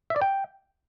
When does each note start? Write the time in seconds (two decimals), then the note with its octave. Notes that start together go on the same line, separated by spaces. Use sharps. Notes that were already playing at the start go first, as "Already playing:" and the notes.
0.10 E5
0.16 D5
0.22 G5